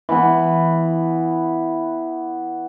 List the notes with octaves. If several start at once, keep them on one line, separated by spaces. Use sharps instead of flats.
E3 B3